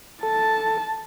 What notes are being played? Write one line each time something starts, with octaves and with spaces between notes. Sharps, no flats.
A4 A5